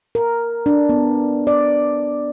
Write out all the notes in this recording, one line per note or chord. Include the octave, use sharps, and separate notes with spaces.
A#4
D4
B3
D5